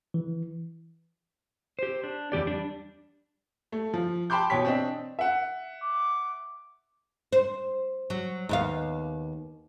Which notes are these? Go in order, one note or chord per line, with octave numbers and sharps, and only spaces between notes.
E3
G4 C5
D4
E2 F3 G4 D5
G3 D4
A3
F3
G5 A5 B5 C6 D6 G6
B2 E3 G4 C#5 B6
C4 D4 D#5
E5 F#5
D6
C5
F#3
D#2 B3 F5